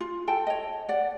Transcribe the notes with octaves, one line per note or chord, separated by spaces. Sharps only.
F4
A4 G5 A5
C#5 D#5
D5 F#5